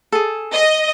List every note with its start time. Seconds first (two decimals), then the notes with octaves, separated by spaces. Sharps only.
0.12 G#4 A4
0.53 D#5